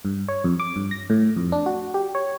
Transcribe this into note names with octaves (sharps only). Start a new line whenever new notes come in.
G2
C#5
F2
D6
G2
A#6
A2
F2
D4
F#4
G4
C#5